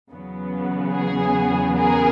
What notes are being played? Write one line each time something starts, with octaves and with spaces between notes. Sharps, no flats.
E2 C#3 F#3 B3
G#4
G#4 A#4